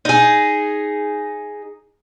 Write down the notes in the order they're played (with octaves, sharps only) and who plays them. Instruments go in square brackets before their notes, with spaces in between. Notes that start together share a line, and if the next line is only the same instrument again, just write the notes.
[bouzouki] D#4 G#4